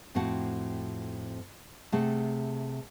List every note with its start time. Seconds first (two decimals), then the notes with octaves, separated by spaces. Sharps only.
0.15 F2 A2 C4 F#4 F#5 A5
1.92 C3 A3 G#4 F#5 A5